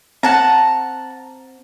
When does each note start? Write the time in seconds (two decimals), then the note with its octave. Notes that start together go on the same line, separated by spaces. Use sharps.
0.23 C4 F#5 A5 A#5